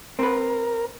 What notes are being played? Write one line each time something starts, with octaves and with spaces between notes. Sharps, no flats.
C4 A#4 B4